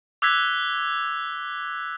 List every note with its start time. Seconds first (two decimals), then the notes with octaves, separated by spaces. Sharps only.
0.22 D6 E6 F#6 G#6 B6